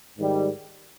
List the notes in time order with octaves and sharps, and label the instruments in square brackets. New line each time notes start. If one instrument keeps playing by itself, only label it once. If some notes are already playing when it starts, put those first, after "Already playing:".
[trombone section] G#2 D#3 G3